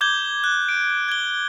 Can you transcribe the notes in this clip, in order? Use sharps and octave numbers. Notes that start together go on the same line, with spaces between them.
D6 G6 G#6 G7
F#6
D7
G#6 G7